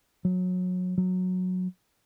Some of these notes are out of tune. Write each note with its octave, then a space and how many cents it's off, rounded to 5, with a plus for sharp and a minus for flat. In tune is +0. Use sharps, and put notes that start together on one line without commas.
F#3 -25
F#3 -15